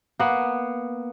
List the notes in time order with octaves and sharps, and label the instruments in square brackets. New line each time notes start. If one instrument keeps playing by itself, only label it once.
[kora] A#3 B3